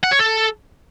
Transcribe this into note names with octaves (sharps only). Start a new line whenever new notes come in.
F#5
C#5
A4